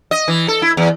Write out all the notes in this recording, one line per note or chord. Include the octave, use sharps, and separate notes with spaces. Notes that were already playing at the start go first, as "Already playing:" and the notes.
D#5
E3
A4
E4
E2